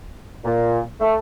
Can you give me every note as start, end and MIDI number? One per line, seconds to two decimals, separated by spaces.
0.44 0.79 46
1.01 1.16 57